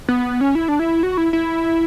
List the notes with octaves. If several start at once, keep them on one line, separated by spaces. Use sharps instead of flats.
B3
C#4
E4
D4
E4
F#4
E4
E4